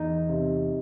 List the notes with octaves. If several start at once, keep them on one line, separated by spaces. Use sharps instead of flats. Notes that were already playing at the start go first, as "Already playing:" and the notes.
Already playing: E2 D#4
C3